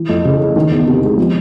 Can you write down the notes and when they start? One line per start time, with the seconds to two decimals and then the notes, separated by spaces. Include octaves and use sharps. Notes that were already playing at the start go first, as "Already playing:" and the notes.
Already playing: E3
0.09 F2
0.25 C#3
0.40 A3
0.56 D#3
0.71 E2
0.87 C3
1.03 G#3
1.17 F3